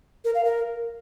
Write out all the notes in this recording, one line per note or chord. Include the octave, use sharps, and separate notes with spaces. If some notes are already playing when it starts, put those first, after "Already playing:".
A#4
F5
A#4